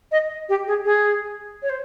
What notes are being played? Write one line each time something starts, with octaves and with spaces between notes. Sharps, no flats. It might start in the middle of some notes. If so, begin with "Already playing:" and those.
D#5
G4
G#4
G#4
C#5
C5